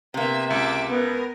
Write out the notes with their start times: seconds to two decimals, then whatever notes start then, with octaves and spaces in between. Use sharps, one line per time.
0.14 C3 A#3 B3 E5
0.50 C#2 E5 D6
0.90 B3 A#4